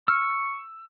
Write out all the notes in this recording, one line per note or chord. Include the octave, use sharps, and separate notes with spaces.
C#6 E6 F6